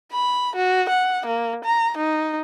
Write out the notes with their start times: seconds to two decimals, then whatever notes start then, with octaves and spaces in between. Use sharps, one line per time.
0.12 B5
0.56 F#4
0.89 F#5
1.26 A#3
1.65 A#5
1.97 D#4